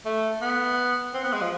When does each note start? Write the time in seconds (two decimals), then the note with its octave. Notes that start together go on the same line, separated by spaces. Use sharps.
0.05 A3
0.42 B3
1.14 C4
1.24 B3
1.33 G#3
1.41 F3